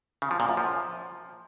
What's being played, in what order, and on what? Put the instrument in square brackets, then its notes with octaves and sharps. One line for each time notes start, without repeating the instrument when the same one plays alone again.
[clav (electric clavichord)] C#3
F3
A#2
F#2
F3